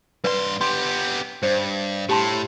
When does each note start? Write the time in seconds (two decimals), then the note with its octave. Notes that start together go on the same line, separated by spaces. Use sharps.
0.24 G2 B4 D5 C6
0.61 B3 G4 C6
1.43 G2 C5
2.09 A2 G4 A5 C6